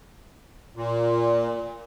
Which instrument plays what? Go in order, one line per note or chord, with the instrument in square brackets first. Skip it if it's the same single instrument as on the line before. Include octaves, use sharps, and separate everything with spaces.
[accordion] A#2